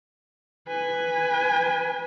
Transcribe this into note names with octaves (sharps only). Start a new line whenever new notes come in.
B4 G#5